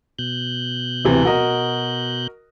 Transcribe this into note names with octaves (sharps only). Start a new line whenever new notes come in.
B2 F#6 G6
D1 C3 E3
F#4 A#4 D#5